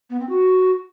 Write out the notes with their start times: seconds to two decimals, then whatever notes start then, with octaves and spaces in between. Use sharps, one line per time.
0.10 B3
0.20 C4
0.29 F#4